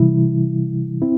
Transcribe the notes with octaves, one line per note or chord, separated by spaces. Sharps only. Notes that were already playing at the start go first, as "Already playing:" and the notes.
Already playing: C3 E3 G3 E4
C4 E4